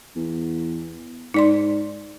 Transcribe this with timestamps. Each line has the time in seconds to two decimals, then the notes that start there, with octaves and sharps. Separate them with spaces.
0.16 E2
1.34 G#2 D#4 D5 C6